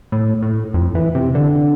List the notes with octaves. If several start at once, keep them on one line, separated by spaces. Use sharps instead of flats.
A2
A2
F2
E3
C3
D3